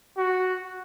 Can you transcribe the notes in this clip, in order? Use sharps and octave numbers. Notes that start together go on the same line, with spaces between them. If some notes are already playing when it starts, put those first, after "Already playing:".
F#4